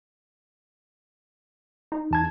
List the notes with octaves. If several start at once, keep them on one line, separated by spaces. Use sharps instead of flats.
D#4
E2 A5 G#6